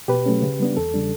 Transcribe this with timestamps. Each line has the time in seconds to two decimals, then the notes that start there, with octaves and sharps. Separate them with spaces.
0.08 B2 G4 B4
0.26 F#3 A3 C#4
0.42 C#3
0.60 G3 B3 D4
0.77 E2 A4
0.94 C#3 G3 D4